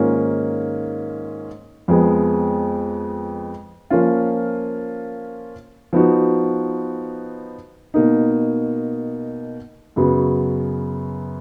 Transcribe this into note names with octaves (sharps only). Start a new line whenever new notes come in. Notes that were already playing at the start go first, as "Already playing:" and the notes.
Already playing: G#2 D#3 A#3 C#4 F4
F2 F3 G#3 B3
F3 A#3 C#4 F4
F3 B3 D#4 F#4
B2 A#3 D#4
F#2 C#3 F#3 B3